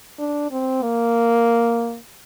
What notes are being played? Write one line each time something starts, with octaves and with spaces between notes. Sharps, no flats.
D4
C4
A#3